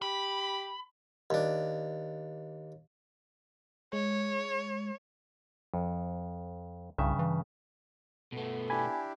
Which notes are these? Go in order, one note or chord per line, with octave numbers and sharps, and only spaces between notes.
G4 B5
D#2 D4
G#3 C#5
F2
C2 G2 C#3 E5
E3
B2 A3 B3 A4
D4 E4 G4 G#5 B5